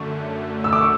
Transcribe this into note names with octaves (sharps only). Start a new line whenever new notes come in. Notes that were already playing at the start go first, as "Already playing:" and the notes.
Already playing: F#2 D3 A3 C#6
E6
D6
C#6